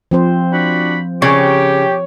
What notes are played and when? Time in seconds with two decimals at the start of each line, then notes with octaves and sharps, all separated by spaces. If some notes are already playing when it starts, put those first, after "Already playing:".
0.11 F3 C4 C5
0.52 D4 F#4 B5
1.22 C#3 G4 C#5